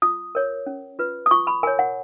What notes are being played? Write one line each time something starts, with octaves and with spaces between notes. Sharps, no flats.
F4 D#6
A#4 C#5
C#4
F4 B4
D#6
F4 C#6
B5
A#4 C#5 G#5
F#5